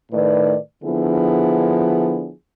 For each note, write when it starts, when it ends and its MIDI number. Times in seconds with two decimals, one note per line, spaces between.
0.12 0.56 45
0.12 0.56 51
0.12 0.56 63
0.12 0.56 71
0.12 0.56 74
0.83 2.31 50
0.83 2.31 53
0.83 2.31 59
0.83 2.31 62
0.83 2.31 64
0.83 2.31 68